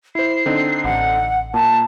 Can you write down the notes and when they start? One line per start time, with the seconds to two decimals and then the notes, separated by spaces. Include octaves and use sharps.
0.15 E4 C5 C7
0.46 D3 C4 D#4
0.85 A1 F#5
1.54 A#2 A5 A#5